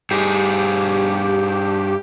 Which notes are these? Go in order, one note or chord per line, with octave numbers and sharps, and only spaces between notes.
G2 G4 G#4